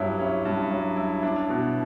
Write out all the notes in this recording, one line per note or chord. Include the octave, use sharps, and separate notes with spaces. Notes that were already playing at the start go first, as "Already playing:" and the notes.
Already playing: G2 F#3 C#4 E4
C#4
G2
F#3
E4
D4
B2